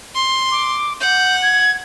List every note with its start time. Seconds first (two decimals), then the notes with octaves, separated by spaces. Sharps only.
0.15 C6
0.51 D6
1.00 F#5 G6
1.42 G#6